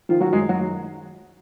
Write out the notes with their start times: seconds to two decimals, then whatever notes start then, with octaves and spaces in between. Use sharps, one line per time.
0.09 D#3 F3 F4
0.21 F#3 F#4
0.33 F#2 G#3 G#4
0.49 F#3 F#4
0.56 D#3